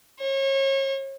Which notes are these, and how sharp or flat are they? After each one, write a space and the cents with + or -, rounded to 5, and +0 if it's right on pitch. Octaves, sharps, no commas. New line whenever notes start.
C#5 -35